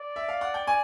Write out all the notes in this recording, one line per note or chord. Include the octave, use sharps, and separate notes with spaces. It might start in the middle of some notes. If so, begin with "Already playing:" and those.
Already playing: D5
E5
F5
F#5
G5
G#5